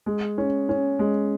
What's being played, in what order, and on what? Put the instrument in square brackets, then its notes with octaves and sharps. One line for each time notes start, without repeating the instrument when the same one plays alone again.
[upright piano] G#3
C#4
C#4
G#3